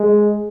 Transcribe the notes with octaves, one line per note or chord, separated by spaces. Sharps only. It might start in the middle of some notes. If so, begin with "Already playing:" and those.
Already playing: G#3